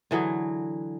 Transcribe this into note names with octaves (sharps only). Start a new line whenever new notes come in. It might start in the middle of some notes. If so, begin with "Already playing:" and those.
D3 E3 F#3 G#4